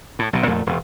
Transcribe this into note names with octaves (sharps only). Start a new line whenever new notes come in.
A2
B1 B2
F2 A#2 A3
E1